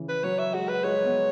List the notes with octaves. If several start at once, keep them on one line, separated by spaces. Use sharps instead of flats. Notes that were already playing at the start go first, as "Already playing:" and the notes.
Already playing: C#3 E3
B4
F#3 C#5
E5
G#3 F#4
B4
G#3 C#5
B3